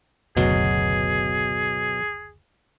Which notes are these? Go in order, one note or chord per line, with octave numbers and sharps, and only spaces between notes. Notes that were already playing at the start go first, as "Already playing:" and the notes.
F#1 D2 B2 F#3 G#4